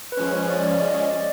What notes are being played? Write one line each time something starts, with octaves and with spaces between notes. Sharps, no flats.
B4
F3 G#3 C#4 C5
C#5
D5
D5
D#5
D#5
D5